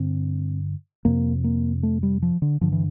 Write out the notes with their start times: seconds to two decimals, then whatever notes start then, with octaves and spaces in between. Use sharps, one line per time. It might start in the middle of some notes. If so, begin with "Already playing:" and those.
Already playing: G2 D3 C4
1.05 F2 C3 A#3
1.44 A#3
1.83 A3
2.03 G3
2.22 F3
2.42 D3
2.61 G2 D3 F3
2.72 E3